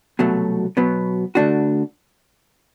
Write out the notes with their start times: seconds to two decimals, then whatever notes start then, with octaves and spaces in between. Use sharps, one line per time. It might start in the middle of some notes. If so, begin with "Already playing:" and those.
0.19 C2 B2 F#3 A3
0.77 B2 F#3 B3
1.35 D3 A3 D4 F#4